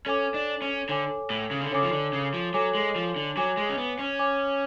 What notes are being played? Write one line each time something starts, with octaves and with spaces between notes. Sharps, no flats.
C#4 A4 C#5 G#5 D6
D4
C#4
D3 A4 C#5 G#5 D6
A2
C#3
D3
C#3 A4 C#5 G#5 D6
F3
D3
C#3
F3
F#3 A4 C#5 G#5 D6
G#3
F3
D3
F#3 C#5 G#5 D6
G#3
C#4
B3
C#4
C#5 G#5 D6